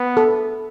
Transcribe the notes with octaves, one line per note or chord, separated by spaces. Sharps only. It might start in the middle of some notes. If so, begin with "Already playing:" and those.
Already playing: B3
A4